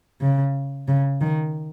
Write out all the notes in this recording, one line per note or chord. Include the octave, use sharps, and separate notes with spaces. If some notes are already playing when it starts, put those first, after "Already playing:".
C#3
C#3
D#3